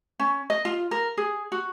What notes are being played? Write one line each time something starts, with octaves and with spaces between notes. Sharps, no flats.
C#4
D#5
F4
A#4
G#4
F#4